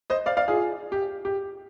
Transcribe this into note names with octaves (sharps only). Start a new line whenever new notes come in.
C5 D#5
D5 F5
D5 F5
F4 G#4
G4
G4